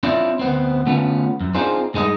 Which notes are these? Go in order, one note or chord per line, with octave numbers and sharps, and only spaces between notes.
C4 D4 E4 F4 C#5 D5
D2 B3 C4
D3 A3 B3 C#4 F4
F#2
C4 D4 D#4 F4 G#4 C5
G2 G#3 D#4 A#4 D#5